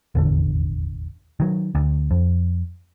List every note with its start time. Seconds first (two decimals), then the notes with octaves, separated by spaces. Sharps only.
0.15 D#1 G#1 E2 D3
1.40 D#3 F#3
1.75 D2
2.11 F2